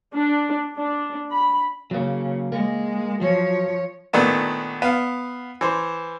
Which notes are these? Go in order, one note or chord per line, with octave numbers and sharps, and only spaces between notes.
D4
D4
B5
C#3 F#3 A#3
G#3 A#3
F3 F#3 C#5
A#2 D#3 A3 B3 D4
B3 F5
E3 C5